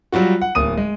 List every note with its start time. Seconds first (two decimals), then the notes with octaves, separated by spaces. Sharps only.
0.12 F#3 G3 F4 F#4
0.41 F#5
0.55 D1 A#3 D#6 D#7
0.77 G#3